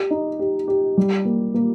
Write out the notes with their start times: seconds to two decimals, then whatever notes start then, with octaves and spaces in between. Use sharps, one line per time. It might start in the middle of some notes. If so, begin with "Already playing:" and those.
Already playing: G4
0.11 D#4
0.39 G4
0.68 G4
0.97 G3
1.25 A#3
1.54 A#3